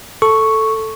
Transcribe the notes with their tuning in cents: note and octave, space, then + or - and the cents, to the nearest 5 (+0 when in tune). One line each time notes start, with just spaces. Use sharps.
A4 +0 C#6 +0